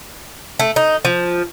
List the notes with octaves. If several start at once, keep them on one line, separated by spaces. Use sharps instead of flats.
A3
D#4
F3